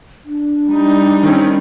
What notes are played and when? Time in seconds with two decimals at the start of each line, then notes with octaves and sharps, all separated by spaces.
0.25 D4
0.69 G3 D#4
1.23 D#3 C4 C#4